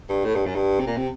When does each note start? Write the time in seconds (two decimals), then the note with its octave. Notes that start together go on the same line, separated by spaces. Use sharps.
0.09 G2
0.25 A2
0.35 G2
0.46 F#2
0.56 G2
0.79 C3
0.87 A#2
0.97 C3